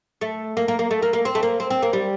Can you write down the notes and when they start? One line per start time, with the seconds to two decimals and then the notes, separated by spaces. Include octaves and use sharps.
0.21 A3
0.57 A#3
0.68 A#3
0.79 A#3
0.91 A3
1.02 A#3
1.13 A#3
1.25 C4
1.35 A3
1.43 A#3
1.60 C4
1.70 C4
1.83 A#3
1.93 G3